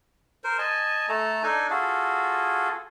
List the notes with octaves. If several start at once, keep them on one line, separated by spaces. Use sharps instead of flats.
A#4 C5
D#5 G#5 A5
A3 A4 A5 A#5
D4 D#4 A4 G#5
F4 F#4 G#4 A4